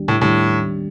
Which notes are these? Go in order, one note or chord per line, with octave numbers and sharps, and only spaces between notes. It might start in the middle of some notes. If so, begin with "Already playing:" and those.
Already playing: D#2 D#3 G3 D4 G4
A2
D#2 A2 D#3 G3 D4 G4